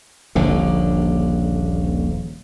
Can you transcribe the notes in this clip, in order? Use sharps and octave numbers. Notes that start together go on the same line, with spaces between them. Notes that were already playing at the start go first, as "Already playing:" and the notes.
D#1 A#1 D3